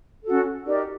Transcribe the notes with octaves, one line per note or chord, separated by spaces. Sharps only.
C#4 F#4 A4
D#4 G4 A#4 D5